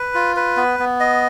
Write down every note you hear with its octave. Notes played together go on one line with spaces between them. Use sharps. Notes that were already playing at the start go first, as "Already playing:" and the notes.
Already playing: B4
F4
B4
B3
B3
D#5